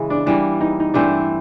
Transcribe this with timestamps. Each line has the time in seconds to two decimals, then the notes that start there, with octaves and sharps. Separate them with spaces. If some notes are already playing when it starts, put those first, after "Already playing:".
Already playing: C#3 E3 G#3
0.10 D4
0.26 E3 G3 A#3 D4
0.61 D#4
0.80 D#4
0.94 G2 E3 A3 C4 D4